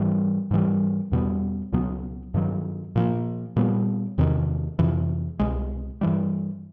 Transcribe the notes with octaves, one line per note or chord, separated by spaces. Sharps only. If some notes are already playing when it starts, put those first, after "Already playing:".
Already playing: G#2 E3 G3
G#2 E3 G3
E2 B2 G3 B3
C#2 B2 F#3 B3
G2 D#3 F#3
A#2 F3 A#3
A#2 G3 B3
E2 C3 D#3
F2 C3 E3
C2 B2 G#3
G2 E3 G3